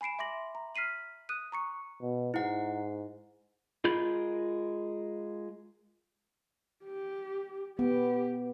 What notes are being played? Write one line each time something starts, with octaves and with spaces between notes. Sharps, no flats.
G#5 B5 C7 D7 E7
E5 C6 D6 A#6 F#7
A#5
F6 B6 C7 D#7 F#7
D#6 F#6 D#7
A#5 C#6 C#7
B2
G#2 E4 F#5
G#3 F4 A#4 B5 G6
G4
B3 G4